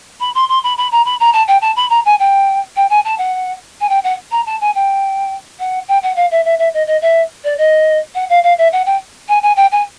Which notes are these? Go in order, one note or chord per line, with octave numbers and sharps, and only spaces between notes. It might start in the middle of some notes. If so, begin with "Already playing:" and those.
B5
C6
C6
B5
B5
A#5
B5
A#5
A5
G5
A5
B5
A#5
G#5
G5
G5
G#5
A5
F#5
G#5
G5
F#5
A#5
A5
G#5
G5
F#5
G5
F#5
F5
E5
E5
E5
D#5
D#5
E5
D5
D#5
F#5
F5
F5
E5
F#5
G5
G#5
G#5
G5
G#5